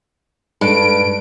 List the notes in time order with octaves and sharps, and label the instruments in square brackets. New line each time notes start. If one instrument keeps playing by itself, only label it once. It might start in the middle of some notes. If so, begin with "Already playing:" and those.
[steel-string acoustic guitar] G2 [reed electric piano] G#3 A4 [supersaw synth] D7